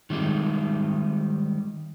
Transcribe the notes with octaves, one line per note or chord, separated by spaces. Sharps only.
D#3 G3 G#3 D#4